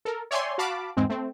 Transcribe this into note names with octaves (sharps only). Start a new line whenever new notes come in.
A4 A#4
C#5 D5 E5 G5 G#5 C6
F#4 F5 A5 B5 D6
E2 G#2 G#3 C4
A3 C4